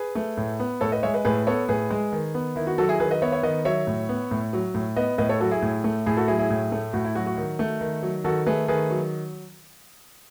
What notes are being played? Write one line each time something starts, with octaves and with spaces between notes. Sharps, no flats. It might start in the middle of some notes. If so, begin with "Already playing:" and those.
Already playing: G#4 B4
A3
A2
B3
A2 A4 C#5
B4 D#5
G#3 C#5 E5
B4 D#5
A2 G#4 B4
B3 A4 C#5
A2 G#4 B4
G#3
D#3
B3
D#3 E4
F#4
F#3 F#4 A4
E4 G#4
D#3 G#4 B4
B4 D#5
B3 C#5 E5
C#5 E5
D#3 B4 D#5
F#3 C#5 E5
A2
B3
A2
F#3
A2
B3 B4 D#5
A2 B4 D#5
A4 C#5
F#3 F#4 A4
E4 G#4
A2
A3
A2 E4 G#4
F#4 A4
F#3 E4 G#4
E4 G#4
A2
A3
A2 F#4
E4
F#3 F#4
F#4
D#3
A3
D#3
F#3
D#3 F#4 A4
A3 G#4 B4
D#3 G#4 B4
F#3